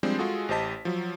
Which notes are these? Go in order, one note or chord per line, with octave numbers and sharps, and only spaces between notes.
F3 G3 G#3 C4 D4 C5
G#3 F4 F#4 G#4 A4
A1 G4 C5 D#5 A5 B6
F3 F#3